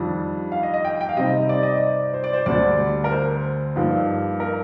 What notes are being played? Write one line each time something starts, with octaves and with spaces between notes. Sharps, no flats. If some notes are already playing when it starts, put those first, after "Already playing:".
Already playing: F2 D#3 G3 D4
F5
D#5
D#5
G5
G5
F5
C3 G3 C4 D#4 D#5
D5
D#5
D5
C5
D5
C5
D2 D3 G3 D5
A#4
C5
G2 F3 A#3 D#4
A#4